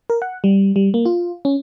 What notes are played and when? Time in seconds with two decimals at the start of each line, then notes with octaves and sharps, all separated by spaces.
0.10 A#4
0.22 F#5
0.44 G3
0.76 G3
0.94 A#3
1.05 F4
1.45 C#4